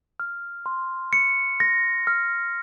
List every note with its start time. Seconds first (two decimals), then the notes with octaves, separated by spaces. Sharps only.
0.20 F6
0.66 C6
1.13 C#7
1.60 A#6
2.07 F6